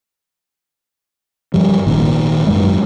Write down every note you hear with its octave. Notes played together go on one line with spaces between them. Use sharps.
G2 F3 G3
G#1 A#2 D#3
F#2 F#3 G#3